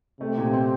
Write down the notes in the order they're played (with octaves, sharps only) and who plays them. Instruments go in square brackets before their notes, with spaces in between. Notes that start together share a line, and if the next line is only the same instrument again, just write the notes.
[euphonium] C3 [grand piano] A3
[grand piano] A#2
C4